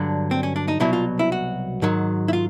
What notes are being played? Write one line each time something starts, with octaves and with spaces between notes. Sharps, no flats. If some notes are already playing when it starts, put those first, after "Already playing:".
Already playing: G2 D3 F#3 D4
C4
C#4
D4
D#4
C2 B2 F#3 E4
F4
E4
F#4
G#2 D#3 F#3
E4
F4